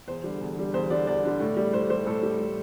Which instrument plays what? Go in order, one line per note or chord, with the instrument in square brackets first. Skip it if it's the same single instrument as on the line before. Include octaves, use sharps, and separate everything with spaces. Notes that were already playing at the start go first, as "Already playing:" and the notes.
[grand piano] E2 C5
D3 G3
E2
D3 G3
E2 C5
D3 G3 D5
E2 D5
D3 G3
A2
G3
A2 C5
G3 C5
A2 A4
G3
A2